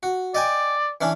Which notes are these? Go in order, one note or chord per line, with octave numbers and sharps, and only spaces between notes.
F#4
D5 D#5 G5 G#5
E3 C#4 D4